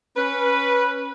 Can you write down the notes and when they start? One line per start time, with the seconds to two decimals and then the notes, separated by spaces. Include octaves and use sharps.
0.17 C#4 B4